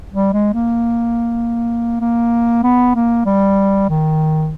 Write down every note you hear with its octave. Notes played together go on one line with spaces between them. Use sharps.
G3
G#3
A#3
A#3
B3
A#3
G3
D#3